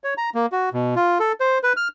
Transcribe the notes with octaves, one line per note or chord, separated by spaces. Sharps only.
C#5
A#5
A#3
F#4
B2
F4
A4
C5
B4
F6